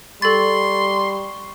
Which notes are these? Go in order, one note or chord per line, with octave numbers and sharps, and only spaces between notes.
G3 A4 C6 C#6 A6